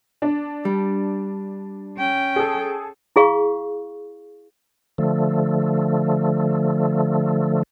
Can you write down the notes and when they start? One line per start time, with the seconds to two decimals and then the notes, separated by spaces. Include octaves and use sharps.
0.22 D4
0.65 G3
1.97 C#4 G5
2.36 G#4 A4
3.16 E4 G#4 F5 C#6
4.98 D3 F3 A3